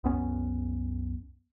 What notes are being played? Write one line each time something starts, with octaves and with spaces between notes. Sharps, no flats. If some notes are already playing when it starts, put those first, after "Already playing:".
C2 F#2 B3 C#4